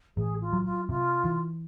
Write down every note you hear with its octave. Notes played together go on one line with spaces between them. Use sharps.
A1 G#4
F4
F#3
F4
C3 F4
E3